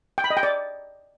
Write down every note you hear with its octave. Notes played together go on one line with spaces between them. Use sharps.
G5
B5
D#5
G5
D5